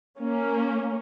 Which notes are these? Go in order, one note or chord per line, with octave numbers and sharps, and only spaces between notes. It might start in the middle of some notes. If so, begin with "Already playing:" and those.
A#3 C#4